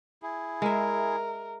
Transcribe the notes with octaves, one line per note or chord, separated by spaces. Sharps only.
E4 G#4
G#3 A#4 E5